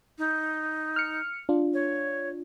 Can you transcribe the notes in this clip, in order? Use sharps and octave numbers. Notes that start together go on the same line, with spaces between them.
D#4
F6 C#7
D4 F4
C#5